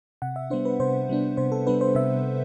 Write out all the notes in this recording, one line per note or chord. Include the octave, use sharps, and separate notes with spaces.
C3 F#5
E5
G3 B3 D4 C5
B4
C3 C5
G3 B3 D4
C3 C5
A4
G3 B3 D4 B4
C5
C3 E5